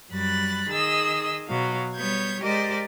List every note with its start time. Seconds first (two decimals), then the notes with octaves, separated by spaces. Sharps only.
0.12 F#2 G3 B5 F#6 A6
0.70 D#3 G#4 D#5 E6
1.47 B2 F#3 F5
1.94 G3 B3 C#5 G6 G#6
2.42 G#3 G4 A#4 C5 D5 D#5